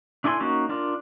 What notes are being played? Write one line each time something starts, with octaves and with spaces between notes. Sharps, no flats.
D4 E4 A4 G#5 C6
A#3 C#4 D#4 F#4
D4 F4 A#4